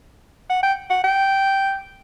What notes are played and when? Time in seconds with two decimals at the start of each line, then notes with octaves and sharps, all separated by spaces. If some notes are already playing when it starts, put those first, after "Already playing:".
0.50 F#5
0.63 G5
0.90 F#5
1.04 G5